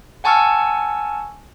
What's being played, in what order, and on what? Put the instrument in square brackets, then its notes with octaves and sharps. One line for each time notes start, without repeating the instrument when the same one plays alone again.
[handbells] F#5 G#5 A5 C#6 E6 F6